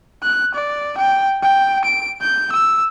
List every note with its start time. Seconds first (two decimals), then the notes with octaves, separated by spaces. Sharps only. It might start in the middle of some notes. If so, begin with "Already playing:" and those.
0.23 F#6
0.55 D5
0.98 G5
1.43 G5
1.85 D7
2.21 G6
2.52 E6